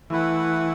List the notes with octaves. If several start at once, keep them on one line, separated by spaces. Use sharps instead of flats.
E3 A3 E4 B4 F#5